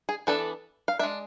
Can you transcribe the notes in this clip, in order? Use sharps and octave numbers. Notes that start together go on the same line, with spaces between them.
G#4
E3 B3 D4 A4
F5
G#3 D4 E5